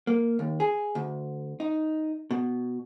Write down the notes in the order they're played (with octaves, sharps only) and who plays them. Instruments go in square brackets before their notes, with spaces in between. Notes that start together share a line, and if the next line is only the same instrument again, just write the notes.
[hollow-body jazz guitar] A#3
D#2
G#4
D2
D#4
B2